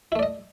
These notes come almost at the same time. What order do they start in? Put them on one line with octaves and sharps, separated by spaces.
E4 A3 D5 D#5